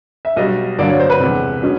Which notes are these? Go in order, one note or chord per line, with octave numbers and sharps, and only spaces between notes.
E5
B1 B2 G3 D#5
G2 D3 F#3 A#3 D5
C#5
C5
B4
E1 E2 C3
B2 G#3 C#4 F#4